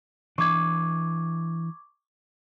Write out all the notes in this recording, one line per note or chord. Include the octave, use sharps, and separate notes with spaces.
E3 D4 C#6 D6 G#6